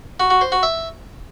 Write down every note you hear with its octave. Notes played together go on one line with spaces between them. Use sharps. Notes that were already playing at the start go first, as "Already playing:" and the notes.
F#4
F#4
C5
F#4
E5